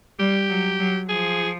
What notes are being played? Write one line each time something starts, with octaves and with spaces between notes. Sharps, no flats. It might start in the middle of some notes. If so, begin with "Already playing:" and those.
G3 G4
F#3
F#3
F3 G#4